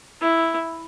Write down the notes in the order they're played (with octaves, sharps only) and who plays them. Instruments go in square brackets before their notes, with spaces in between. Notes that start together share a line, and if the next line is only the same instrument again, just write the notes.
[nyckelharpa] E4